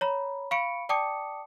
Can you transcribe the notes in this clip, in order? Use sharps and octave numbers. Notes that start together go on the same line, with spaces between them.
C#5 A#5 B5
F5 B5 C#6 C#7 D7
D5 G5 A5 D6 D#6 C#7